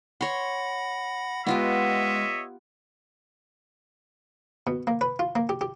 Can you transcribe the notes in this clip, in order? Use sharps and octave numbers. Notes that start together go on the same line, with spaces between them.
C#5 F#5 B5 C6 A#6
G#3 B3 F4 G4 C#5 D#5 E5
B2
A#3
B4
F4
A#3
G4
G4